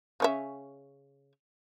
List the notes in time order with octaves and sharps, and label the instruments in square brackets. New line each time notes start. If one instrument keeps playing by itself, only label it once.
[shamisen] C#3 C#4 E5